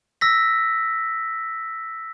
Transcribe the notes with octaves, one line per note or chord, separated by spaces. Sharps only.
E6 A#6 B6